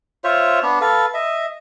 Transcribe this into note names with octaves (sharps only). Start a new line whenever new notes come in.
F4 C5 C#5 E5
B3 D4
A4 B4 F5
D#5 E5